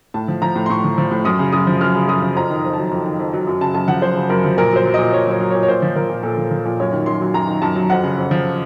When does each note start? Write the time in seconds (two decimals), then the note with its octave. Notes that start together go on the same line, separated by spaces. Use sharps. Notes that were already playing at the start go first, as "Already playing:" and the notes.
0.14 A2 A5
0.28 F3
0.42 F3 A#5
0.56 A2
0.66 C6
0.70 A2 C#6
0.84 F3
0.98 F3
1.11 A2
1.25 F#2 D#6
1.39 C#3
1.53 F#2 D#6
1.67 F3
1.81 F#2 F6
1.95 C#3
2.08 F#2 D#6
2.22 F3
2.36 F2 A#5
2.50 D#3
2.64 F2
2.73 F#3 A5
2.91 F2
3.05 D#3
3.19 F2
3.33 F#3
3.47 F#2
3.61 C#3 A5
3.74 F#2 A5
3.88 F3 F#5
4.02 F#2 C5
4.16 C#3
4.29 F#2 A#4
4.44 F3
4.58 A#2 A#4
4.72 F#3 C5
4.85 F#3
4.94 A#2 D#5
5.13 A#2 C#5
5.27 F#3
5.31 C#5
5.40 F#3
5.50 C#5
5.55 A#2
5.63 C#5
5.68 A#2 C5
5.82 F3
5.96 F3 A#4
6.09 A#2
6.23 A#2 A4
6.37 F3
6.51 F3
6.65 A#2
6.80 F#2 C#5
6.93 D#3
7.06 F#2 C6
7.21 F#3
7.34 F#2 A#5
7.48 D#3
7.62 F#2 A5
7.75 F#3
7.90 F2 F#5
8.04 C#3
8.17 F2
8.31 F3